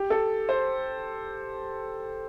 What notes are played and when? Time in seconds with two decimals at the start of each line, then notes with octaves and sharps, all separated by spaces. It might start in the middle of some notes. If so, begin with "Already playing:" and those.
Already playing: G4
0.10 A4
0.49 C5